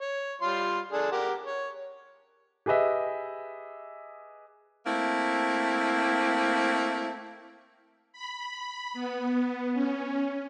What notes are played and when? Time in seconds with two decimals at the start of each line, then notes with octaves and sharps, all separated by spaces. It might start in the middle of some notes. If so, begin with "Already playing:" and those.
0.01 C#5
0.41 G3 F4 C6
0.92 D4 G#4 A4
1.12 G4 A#4 F#5
1.45 C#5
2.66 G4 G#4 B4 D#5 E5
4.86 A3 A#3 C4 E4
8.13 B5
8.93 B3
9.74 C#4